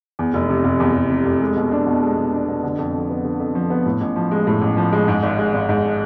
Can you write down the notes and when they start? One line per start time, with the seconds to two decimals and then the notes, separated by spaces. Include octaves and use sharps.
0.19 E2
0.34 F1
0.49 C3
0.65 F1
0.80 E2
0.95 F1
1.10 C3
1.26 F1
1.42 G#3
1.56 B2
1.71 D4
1.87 B2
2.02 G#3
2.18 B2
2.33 D4
2.48 B2
2.64 D3
2.78 F2
2.94 F3
3.09 B3
3.25 D3
3.40 F2
3.55 F3
3.70 B3
3.86 A2
4.01 A1
4.16 F3
4.31 G#3
4.47 A2
4.62 A1
4.77 F3
4.93 G#3
5.08 G#2
5.23 G#1
5.38 G#3
5.54 G#1
5.69 G#2